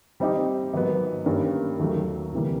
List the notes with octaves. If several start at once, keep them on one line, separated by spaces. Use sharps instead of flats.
G3 C4 D#4 G4
G#2 D#3 F#3 B3
G2 D#3 G3 A#3 C#4
D#2 D#3 F#3 A3
D2 C3 E3 G3 A#3